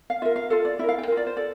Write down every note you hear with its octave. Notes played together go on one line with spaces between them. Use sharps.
F5
F4 A#4 E5
F5
F4 A4 F5
D5
E4 A#4 E5
F5
G5
F4 A#4
D5
C5
A4 D5